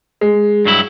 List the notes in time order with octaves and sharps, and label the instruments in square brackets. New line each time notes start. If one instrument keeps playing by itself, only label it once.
[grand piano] G#3
[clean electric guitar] G2 F#3 E4